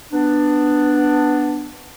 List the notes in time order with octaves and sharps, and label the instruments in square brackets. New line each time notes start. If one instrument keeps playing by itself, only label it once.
[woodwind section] B3 D4